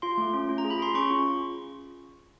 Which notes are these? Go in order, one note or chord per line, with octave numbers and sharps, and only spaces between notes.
F4 C6
A3
C#4
F4
A#5
G#4
B5
G#4 C6
C#4 C#6
F4